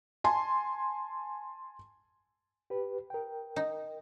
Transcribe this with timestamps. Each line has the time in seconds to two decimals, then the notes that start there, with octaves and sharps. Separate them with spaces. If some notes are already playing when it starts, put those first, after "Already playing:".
0.24 G#5 A5 C6
2.70 G4 B4
3.10 A#4 G5
3.56 D#4